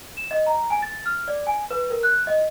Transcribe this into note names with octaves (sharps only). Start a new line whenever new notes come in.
E7
D#5
A#5
G#5
A6
F6
D5
G#5
B4
A#4
F#6
D#5